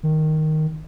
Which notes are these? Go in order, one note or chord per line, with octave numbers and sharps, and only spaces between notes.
D#3